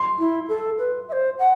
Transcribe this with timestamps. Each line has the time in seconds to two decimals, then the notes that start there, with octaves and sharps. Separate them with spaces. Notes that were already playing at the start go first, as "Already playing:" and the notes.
Already playing: C6
0.19 E4
0.48 A4
0.78 B4
1.08 E5
1.12 C5
1.39 F#5